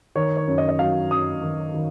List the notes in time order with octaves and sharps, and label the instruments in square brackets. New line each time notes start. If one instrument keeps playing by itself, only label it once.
[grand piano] D#3 C#5
C#5
F#2
D#5
D#5
F#3 F5
F#2 D#6
D#3
D#3